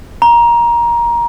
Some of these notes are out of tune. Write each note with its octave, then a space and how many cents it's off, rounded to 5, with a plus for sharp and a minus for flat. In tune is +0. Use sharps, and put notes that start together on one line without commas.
A#5 +20